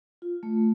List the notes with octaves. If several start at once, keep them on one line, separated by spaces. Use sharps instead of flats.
F4
A3